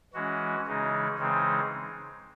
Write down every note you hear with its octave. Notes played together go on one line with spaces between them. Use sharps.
E3 G#3 C#4 F#4
C#3 E3 G#3 D#4
C#3 E3 G#3 C4 D#4